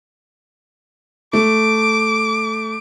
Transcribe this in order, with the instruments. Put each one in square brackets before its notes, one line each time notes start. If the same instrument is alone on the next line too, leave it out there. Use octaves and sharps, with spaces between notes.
[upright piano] A3 [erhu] D6